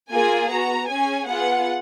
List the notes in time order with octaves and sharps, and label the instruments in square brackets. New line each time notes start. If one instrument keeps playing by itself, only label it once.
[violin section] A#3 F4 G#4 G#5
B3 F#4 A#5
C#4 G#4 G#5
B3 F4 G#4 F#5